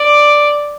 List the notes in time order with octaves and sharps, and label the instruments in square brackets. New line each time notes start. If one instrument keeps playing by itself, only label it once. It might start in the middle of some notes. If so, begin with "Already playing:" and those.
Already playing: [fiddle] D5